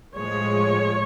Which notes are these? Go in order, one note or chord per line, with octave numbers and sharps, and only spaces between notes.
A2 F3 G#3 C#5